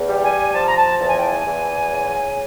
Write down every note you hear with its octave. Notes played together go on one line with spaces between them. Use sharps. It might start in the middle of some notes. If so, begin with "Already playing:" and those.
Already playing: E2
G3
G#5
F3 A5
A#5
A5
E2 A5
G#5
G5
G#5
E2
C#3